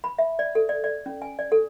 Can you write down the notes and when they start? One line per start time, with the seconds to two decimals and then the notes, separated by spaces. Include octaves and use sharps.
0.04 B5
0.18 E5
0.39 D5
0.55 A4
0.69 D5
0.84 D5
1.06 C#4
1.22 G#5
1.39 D5
1.52 A4